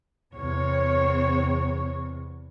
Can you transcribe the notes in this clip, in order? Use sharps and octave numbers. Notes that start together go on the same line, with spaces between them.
E2 C3 C4 C#5